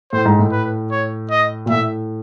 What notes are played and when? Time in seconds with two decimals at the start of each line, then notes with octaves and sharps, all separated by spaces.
0.13 A2 C5
0.25 G#2
0.39 A2
0.52 B4
0.91 C#5
1.30 D#5
1.66 A#2
1.70 A2 E5